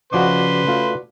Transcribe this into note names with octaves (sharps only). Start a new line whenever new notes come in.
C#3 F3 F#4 B4 D5 D#5 C6 D6
A3 F4